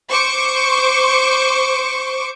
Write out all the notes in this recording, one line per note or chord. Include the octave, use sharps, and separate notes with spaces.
C5 C#6 D6